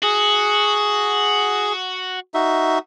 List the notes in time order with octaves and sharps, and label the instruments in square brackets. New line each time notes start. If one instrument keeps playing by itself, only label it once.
[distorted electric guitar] F#4 [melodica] G#4
[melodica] D#4 F#4 E5